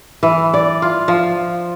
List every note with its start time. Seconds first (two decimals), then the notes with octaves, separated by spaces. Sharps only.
0.23 E3
0.54 D5
0.82 F4
1.08 F3